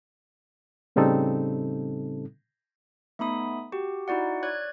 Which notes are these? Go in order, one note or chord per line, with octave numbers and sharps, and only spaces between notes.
A2 C#3 G3 C4 D#4 A4
A3 B3 D#4 B5 D#6
F#4 G4
D#4 E4 F#4 D5 F#5
C#5 D5 F#6 G#6